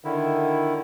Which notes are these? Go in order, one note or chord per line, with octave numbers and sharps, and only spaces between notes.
D3 D#3 E4